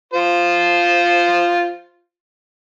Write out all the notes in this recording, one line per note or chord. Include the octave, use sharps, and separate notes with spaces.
F4 C5